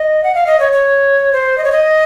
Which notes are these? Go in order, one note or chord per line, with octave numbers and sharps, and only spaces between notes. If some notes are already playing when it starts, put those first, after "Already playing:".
Already playing: D#5
F#5
F5
D#5
C#5
C#5
C5
D#5
C#5
D#5